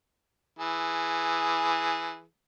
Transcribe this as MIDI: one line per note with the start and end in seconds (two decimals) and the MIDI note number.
0.59 2.23 52
0.59 2.23 68